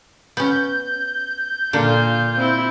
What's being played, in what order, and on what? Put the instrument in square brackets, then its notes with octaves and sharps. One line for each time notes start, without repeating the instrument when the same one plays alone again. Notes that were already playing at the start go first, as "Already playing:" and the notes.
[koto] B3 C#4 [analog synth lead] G6
[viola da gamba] A#2 F4 [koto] D3 A#3
[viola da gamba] C4 E4